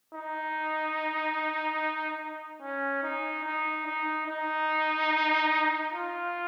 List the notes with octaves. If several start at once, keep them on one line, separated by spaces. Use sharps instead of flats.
D#4
C#4
D#4
D#4
D#4
D#4
F4